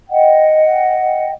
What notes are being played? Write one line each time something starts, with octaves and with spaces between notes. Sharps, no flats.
D#5 F#5 G5